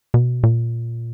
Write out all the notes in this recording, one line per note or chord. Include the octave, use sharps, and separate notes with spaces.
B2
A#2